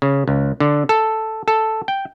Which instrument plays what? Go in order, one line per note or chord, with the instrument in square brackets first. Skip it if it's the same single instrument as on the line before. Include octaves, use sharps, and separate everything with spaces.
[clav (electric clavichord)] C#3
C#2
D3
A4
A4
G5